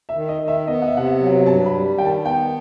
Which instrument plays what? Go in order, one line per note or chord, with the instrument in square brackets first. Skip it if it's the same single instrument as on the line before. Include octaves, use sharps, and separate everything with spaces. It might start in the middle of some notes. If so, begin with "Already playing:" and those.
[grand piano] E5
[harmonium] D#3
[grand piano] D#5
[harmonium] D#3
[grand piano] E5
[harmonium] B3 [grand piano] D#5
[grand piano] F#5
E5
[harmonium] C3 [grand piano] F#5
[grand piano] E5
[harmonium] F#3
[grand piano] F#5
[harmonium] G2 [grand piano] A5
[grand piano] B5
[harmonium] G3
[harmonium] D#3 [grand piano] G5
[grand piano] A5
[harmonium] B3 [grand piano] G5